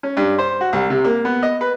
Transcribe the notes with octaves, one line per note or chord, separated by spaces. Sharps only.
C#4
G2
C5
F#4
C2
C3
A#3
B3
D#5
B4